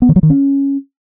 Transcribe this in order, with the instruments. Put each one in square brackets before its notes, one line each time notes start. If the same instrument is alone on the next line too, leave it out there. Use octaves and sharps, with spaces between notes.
[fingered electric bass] B3
D#3
F#3
D#3
C#4